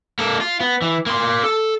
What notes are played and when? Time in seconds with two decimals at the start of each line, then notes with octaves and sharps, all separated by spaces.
0.19 A#3 A4
0.40 F4
0.60 B3
0.82 E3
1.06 A#3 C6
1.44 A4